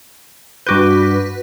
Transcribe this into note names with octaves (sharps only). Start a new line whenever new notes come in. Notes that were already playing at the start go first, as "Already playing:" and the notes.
G2 F#4 B4 D6 G6